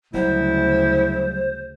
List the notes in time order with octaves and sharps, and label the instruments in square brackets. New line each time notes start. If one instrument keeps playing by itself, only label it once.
[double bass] D2 C#3 [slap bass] F#3 G3 [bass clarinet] E4 [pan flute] C5